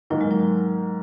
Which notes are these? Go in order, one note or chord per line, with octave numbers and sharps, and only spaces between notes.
G#2 D#3 F#3 A#3
G#3
F#3